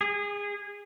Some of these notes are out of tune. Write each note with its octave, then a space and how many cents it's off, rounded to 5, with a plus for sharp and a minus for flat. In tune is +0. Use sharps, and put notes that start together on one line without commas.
G#4 -25